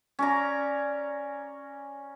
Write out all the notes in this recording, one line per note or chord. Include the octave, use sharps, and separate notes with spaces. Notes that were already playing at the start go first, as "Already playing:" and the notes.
C#4 D5 A#5